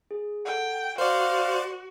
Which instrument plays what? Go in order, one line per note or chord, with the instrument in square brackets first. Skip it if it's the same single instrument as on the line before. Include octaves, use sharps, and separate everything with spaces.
[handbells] G#4
[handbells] A4 F#5 [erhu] G5
[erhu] F#4 [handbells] A#4 [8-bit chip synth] C5 D5 [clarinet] F5